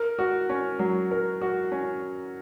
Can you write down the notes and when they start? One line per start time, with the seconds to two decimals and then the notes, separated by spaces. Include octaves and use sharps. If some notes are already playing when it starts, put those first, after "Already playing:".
Already playing: A#4
0.19 F#4
0.49 C#4
0.79 F#3
1.11 A#4
1.41 F#4
1.72 C#4